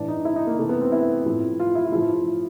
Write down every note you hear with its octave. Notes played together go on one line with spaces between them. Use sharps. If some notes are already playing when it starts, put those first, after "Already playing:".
Already playing: A2 E3 D4
D#4
E4
D#4
A#3
C3 E3 A3
B3
C4
E4
A2 F3
F4
E4
F4
A2 F3 E4
E4